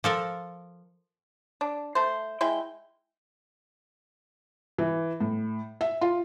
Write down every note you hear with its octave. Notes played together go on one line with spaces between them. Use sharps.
F3 A4 A#4
D4
A3 C5
G#3 E4 G5
E3
A2
E5
F4